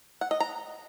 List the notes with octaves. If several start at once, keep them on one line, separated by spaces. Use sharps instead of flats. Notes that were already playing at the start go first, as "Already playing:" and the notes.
F#5
D#5
A#5